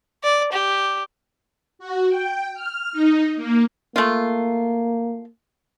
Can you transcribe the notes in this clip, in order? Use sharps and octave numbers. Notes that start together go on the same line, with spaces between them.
D5
G4
F#4
G5
F6
D#4
A#3
A3 A#3 F4